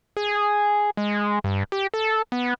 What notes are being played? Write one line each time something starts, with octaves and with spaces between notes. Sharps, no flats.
G#4
G#3
G2
G4
A4
B3